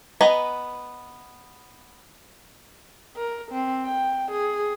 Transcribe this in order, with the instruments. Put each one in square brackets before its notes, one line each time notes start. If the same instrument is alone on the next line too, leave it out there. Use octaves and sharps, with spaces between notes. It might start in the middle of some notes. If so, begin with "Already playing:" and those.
[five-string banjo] B3 B4 D#5 G#5 A#5
[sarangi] A#4
C4
G5
G#4